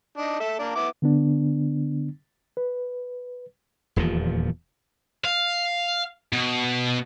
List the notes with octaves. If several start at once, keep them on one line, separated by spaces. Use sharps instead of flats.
D4 D#4
A4 E5
A#3 D4 D5
B3 E4 D6
D3 B3 D4
B4
D#1 E2 A#2 F3
F5
B2